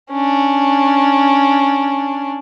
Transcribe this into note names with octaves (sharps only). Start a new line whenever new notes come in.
C#4 D4